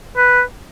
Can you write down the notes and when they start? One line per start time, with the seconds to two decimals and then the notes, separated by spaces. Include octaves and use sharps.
0.17 B4